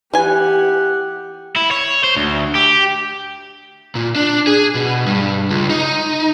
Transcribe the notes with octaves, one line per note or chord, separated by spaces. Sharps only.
E3 G4 F#5 G#5
E4
C#5
C5
D2
G4
A#2
D4
G#4
B2
G2
C#2
D#4